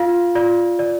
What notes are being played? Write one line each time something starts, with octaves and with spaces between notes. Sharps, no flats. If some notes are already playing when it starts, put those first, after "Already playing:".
Already playing: F4 F5
F4 D5
D5